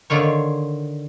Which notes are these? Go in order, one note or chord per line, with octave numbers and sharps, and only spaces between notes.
D3 D#3 F4 C#5